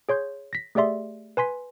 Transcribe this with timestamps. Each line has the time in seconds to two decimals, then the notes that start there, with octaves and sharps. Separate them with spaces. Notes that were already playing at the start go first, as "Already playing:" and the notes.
0.09 G#4 C#5 C6 G6
0.53 A#6 B6
0.75 A3 G4 G#4 D5 E5 C6
1.37 B4 G#5 C6 B6